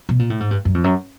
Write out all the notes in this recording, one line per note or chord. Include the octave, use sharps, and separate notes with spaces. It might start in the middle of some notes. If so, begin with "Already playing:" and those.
B2
A#2
A2
G#2
G2
F#2
F2
F#2